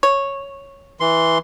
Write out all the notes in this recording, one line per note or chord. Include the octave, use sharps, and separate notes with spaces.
C#5
E3 C6